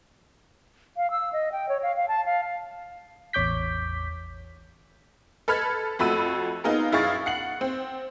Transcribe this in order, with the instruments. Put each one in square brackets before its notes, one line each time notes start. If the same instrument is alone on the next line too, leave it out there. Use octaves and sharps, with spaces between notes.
[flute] F5
E6
D#5
G5
C#5
F5
F5
A5
F5
[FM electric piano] A1 E2 C#5 D6 G6 B6
[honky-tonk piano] A4 B4 B5 F6 G#6
F2 A3 F#4 B5 E6 D#7
B3 D#4 F4 G#4 A#4
F#2 E4 G#4 F5 C#6 A6
F#5 C7 F#7
C4